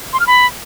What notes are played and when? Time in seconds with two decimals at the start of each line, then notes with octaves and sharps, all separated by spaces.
0.13 C6
0.20 F6
0.27 B5